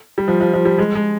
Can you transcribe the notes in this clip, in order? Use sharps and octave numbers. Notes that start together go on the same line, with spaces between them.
G3
F3
F3
F3
G3
G#3
G#3